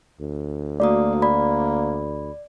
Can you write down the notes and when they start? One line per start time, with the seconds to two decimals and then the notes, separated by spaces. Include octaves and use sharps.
0.20 D2
0.80 A3 A#3 F#4 D5 D#6
1.22 D5 B5